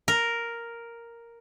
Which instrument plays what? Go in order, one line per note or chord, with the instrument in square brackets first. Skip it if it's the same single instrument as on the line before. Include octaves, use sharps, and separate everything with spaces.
[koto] A#4